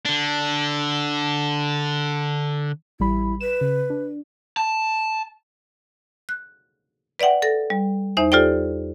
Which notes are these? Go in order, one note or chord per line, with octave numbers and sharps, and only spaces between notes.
D3 D4
A1 G3 E4 B5
B4 E7
C#3
D4
A5
F#6
B4 D5 E5 F#5 G5
A4 A#6
G3
E2 D#4 C5 E5
F4 G4 A4 C5 D5 G5